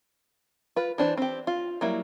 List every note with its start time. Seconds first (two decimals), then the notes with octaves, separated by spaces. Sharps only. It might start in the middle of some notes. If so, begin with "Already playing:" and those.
0.76 F4 B4
0.98 E3 D4 C5
1.17 C4 G4
1.47 F4
1.81 F#3 G3 A#3 E4